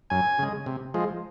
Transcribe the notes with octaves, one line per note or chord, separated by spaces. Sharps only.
F#2 G#5
C#3 G#3
C3
F3 G#3